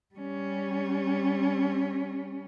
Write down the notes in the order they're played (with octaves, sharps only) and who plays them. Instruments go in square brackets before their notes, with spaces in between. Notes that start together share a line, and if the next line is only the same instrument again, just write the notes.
[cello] G3 C#4